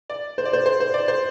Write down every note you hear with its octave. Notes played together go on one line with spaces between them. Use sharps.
D5
C5
D5
C5
C5
C5
D5
C5